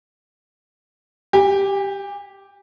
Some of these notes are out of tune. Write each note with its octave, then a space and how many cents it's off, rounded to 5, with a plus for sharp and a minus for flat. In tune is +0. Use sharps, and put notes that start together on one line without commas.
G4 +0 G#5 -45